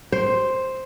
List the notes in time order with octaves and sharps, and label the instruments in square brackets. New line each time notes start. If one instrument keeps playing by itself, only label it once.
[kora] C5